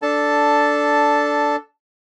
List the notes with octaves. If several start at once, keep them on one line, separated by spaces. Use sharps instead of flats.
D4 A4 A5